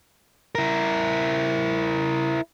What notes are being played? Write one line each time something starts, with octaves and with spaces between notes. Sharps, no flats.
E4 A#4